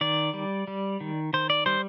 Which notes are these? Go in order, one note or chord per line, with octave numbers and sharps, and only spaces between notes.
D#3 D5
G3
G3
D#3
D#3 C5
D5
G3 C5